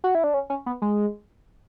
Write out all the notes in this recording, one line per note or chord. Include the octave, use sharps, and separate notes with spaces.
F#4
E4
D4
C#4
C#4
B3
G#3